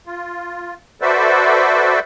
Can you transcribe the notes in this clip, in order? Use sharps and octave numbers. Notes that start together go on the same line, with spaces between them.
F4
F#4 A4 B4 C5 D5 E5